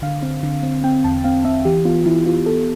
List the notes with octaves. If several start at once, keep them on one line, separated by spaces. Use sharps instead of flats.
D3 F5
C4
D3
C4
C4 G5
E2 A5
C4 F5
C4 E5
E3 G4
B3 F4
E3 E4
B3 F4
B3 A4